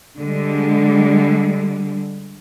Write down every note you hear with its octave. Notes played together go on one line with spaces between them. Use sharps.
D3 G3 G#3